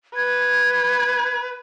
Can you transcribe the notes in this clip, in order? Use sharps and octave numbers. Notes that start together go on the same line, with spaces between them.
B4 G#6